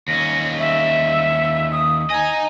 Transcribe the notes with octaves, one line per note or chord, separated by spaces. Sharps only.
D#2 C#4 A#6
E5
D#6
D#5 G#5 A#5